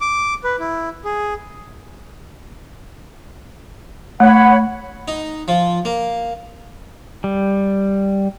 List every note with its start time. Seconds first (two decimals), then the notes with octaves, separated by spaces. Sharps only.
0.01 D6
0.44 B4
0.60 E4
1.05 G#4
4.20 A3 C#5 F#5 B5
5.08 D#4
5.48 F3
5.85 A#3
7.24 G3